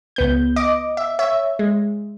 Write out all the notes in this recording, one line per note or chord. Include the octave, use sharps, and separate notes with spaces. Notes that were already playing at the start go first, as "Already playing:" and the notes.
C#2 B3 G6
D#5 D6
E5
C#5 E5
G#3